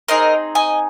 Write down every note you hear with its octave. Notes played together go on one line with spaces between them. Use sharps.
C4 D#4 G#4 A#4 D#5
D#5 G#5